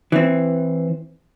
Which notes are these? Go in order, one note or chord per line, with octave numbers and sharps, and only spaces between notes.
E3 C4